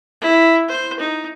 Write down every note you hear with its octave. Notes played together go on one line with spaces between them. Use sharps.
E4
C5
D#4